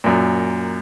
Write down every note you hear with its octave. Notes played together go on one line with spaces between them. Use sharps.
F#2 A#2